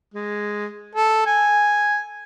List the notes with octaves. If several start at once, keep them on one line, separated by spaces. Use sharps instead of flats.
G#3
A4
G#5